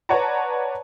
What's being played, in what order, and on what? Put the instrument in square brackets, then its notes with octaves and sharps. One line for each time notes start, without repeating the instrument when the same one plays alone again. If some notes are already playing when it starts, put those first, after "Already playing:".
[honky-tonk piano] B4 C#5 D5 F#5 A5 A#5